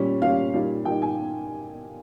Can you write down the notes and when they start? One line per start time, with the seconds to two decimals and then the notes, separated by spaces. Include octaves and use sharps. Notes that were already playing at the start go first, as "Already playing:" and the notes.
Already playing: A#2 G3 C#4
0.22 A#2 G3 C#4 F5
0.54 A#2 G3 A#3 D#4
0.85 A#2 G3 A#3 D#4 G5
1.02 G#5